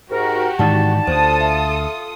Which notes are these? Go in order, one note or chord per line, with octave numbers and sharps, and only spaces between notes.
G#2 F#4 G4 A#4
G#2 D#3 E3 D#4 D5 F#5 A5
D2 F4 A4 C5 D5 D#6
E5